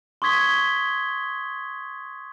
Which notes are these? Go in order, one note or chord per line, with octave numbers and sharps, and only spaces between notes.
C6 C#6 D#6 G#6 B6 G7